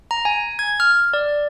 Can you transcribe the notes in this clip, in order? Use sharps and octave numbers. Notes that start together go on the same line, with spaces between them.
A#5
G#5
G#6
F6
D5